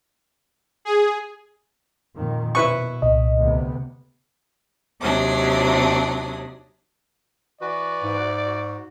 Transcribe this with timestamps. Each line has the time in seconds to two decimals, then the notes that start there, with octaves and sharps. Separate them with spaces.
0.85 G#4
2.16 F2 A#2 D#3
2.55 B2 E4 B4 C#6
3.02 C2 A#2 D#5
3.37 D2 C3 B3
5.01 D#2 C3 F#3 D4 D#6
7.61 E3 F#4 B4 D5
8.03 G#2
8.46 F#4